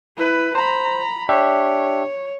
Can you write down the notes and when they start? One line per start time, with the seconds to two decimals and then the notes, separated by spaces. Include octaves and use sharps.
0.16 E4 B4
0.55 C5 A#5 B5
1.29 D4 G4 C#5 E5